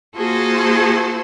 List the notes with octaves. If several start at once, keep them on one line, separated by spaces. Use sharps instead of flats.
A#3 F4 F#4 G#4 A4 C5